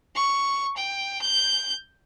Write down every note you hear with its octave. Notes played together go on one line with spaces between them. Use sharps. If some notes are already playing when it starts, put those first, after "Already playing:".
C#6
G5
G6